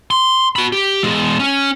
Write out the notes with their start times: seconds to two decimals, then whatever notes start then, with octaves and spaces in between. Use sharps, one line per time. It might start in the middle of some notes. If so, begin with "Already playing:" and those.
0.11 C6
0.56 F#4 B5
0.72 G4
1.03 E2 G#3
1.39 C#4